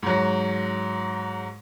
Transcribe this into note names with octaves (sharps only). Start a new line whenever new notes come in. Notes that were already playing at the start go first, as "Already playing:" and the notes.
G#2 F#3